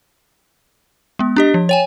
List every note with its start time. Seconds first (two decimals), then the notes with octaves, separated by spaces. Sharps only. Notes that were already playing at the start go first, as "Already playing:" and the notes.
1.19 G#3 B3
1.36 D4 G4 D#5
1.54 F3
1.69 C#5 G5 G#5